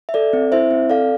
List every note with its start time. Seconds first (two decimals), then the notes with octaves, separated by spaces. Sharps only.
0.09 E5
0.14 A4 D5
0.33 C4
0.52 E4 C5 E5
0.71 C4
0.90 A4 D5 F5